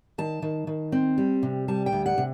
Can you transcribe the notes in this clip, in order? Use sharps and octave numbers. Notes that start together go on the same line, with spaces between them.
D#3 A5
D#3
D#3
C4
G3
C3
G3 A5
G5
D2
F#5
C3